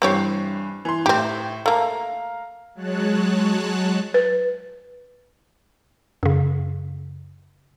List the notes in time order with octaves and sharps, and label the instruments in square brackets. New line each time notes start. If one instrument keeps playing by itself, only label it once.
[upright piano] G2 E3 C7 [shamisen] C4 G4 C#5
[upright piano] E3 C6
[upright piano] A2 E4 [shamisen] C4 G4
[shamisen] A3 A#3 [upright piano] F5 A#5
[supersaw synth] F#3 G#3 C#5 A5 F#6
[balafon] B4
[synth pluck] F#2 C#3